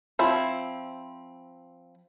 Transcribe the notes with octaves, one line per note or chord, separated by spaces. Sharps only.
F3 C4 E4